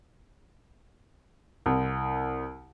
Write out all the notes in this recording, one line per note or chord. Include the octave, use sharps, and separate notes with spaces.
C2